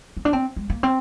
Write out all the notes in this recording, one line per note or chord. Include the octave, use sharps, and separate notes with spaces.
C4
D4
C4
G#3
A#3
C4